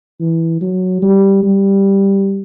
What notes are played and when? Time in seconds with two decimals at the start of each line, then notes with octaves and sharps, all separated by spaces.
0.20 E3
0.61 F#3
1.02 G3
1.43 G3